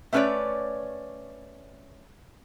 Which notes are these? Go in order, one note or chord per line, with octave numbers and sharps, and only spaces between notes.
A3 B3 C#4 B4 C#5 D5